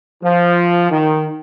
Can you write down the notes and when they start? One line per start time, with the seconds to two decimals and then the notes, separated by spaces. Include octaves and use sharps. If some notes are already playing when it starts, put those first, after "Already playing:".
0.22 F3
0.90 D#3